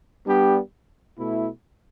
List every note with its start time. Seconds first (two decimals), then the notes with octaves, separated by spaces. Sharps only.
0.27 G3 B3 D4 G4
1.17 B2 A3 E4